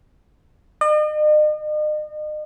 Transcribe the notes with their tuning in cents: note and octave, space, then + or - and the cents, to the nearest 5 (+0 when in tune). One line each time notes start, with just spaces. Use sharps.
D#5 -40